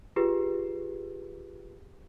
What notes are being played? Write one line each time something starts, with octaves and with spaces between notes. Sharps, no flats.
F4 G4 G#4 B4